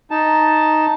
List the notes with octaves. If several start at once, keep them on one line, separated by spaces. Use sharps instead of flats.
D#4 A5